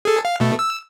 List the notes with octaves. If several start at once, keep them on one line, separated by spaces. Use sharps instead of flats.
G#4 A4
F5
B2 A3
E6